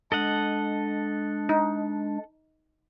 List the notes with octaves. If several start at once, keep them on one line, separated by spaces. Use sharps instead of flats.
G#3 D4 A4 D#5 F#5
D#4